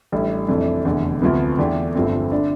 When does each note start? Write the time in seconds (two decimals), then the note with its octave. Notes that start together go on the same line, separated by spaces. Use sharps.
0.12 A1 A2 G3 D4 A4
0.48 F2 C3 E3 A3 D4
0.85 F1 E2 D3 A3
1.22 D2 C3 F3 B3
1.58 E2 D3 A3 D4 G4
1.95 G1 G2 F3 A3 C4
2.32 D3 A3 D4